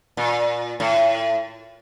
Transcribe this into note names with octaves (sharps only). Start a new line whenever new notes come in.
A#2
A2